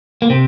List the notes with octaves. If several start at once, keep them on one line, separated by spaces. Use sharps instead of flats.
A#3
C3 C4